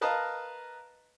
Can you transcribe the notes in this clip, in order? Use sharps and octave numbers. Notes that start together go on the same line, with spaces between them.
A#4 B4 D#5 F5 A5 A#5